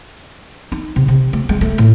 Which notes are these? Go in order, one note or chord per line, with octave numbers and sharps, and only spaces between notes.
D#4
C3
C3
A3
G#3
A3
A2